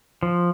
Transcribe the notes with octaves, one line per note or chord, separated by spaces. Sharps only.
F3